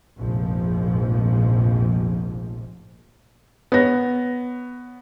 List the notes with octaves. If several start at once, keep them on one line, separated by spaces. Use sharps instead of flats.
F1 A#1 G#2 F3
B3 C#5 A#6